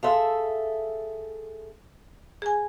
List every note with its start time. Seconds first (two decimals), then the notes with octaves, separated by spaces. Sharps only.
0.03 G#4 A4 E5 F5 C6
2.42 G#4 G#5